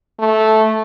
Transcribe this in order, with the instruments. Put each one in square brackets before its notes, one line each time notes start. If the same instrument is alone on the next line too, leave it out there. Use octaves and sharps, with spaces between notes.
[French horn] A3